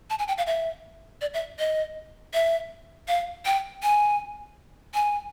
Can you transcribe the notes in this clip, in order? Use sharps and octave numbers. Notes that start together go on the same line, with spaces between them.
A5
G#5
G5
F5
E5
D5
E5
D#5
E5
F5
G5
G#5
G#5